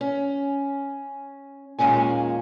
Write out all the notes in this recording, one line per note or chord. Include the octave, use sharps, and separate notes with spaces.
C#4
D#2 A#2 G#3 C#4 G#5